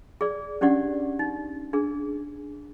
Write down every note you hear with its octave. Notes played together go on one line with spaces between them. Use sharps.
G#4 D5
C#4 D4 G4 D5 F#5
D#4
D4 G#4